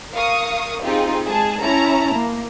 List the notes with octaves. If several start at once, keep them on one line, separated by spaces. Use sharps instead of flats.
A#4 F5 C#6 D#6
C4 D#4 F4 G4 G#4
G#3 G#4 A5
C#4 E4 A5 A#5
A#3